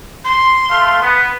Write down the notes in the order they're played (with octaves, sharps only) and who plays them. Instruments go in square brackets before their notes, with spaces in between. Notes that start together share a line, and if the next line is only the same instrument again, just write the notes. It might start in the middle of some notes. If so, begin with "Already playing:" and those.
[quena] C6
[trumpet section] A3 F5
B3